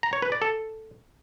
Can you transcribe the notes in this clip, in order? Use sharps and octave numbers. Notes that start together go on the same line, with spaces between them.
A#5
C#5
B4
D5
A4